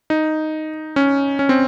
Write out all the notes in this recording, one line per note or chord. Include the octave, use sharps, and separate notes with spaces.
D#4
C#4
C#4
C4